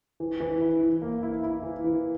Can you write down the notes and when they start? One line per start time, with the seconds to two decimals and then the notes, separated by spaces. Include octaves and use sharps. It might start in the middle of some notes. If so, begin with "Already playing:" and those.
0.20 E3
0.40 E3
0.61 E4
0.81 E3
1.02 A#3
1.23 E4
1.43 E4
1.63 E3
1.84 E3